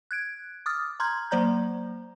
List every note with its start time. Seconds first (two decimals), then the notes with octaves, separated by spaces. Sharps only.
0.11 F#6 G#6 D7
0.66 D6 D#6 F6 A6
1.00 A#5 C6 F6 G6 G#6
1.31 F#3 A#3 C5 D5 A#5 G6